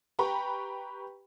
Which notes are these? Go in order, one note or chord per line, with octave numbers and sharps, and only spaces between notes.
G4 B4 G5 A#5 B5 C#6